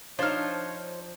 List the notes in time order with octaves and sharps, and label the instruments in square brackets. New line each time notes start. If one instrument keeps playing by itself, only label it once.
[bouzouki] F3 [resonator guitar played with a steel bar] D4 D#4 [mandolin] C5 F6 [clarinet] C#5